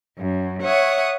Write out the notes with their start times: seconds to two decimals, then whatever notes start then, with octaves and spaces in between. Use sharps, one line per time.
0.18 F#2
0.62 C#5 E5 F#5 D#6